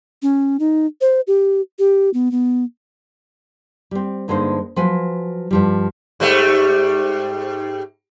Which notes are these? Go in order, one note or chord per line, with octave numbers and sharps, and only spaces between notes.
C#4
D#4
C5
G4
G4
B3
B3
G3 C4
G2 D3 G#3 A#3 D#4 C5
F3 F#3 B4 G#5
G2 F3 G3
G#2 G3 A3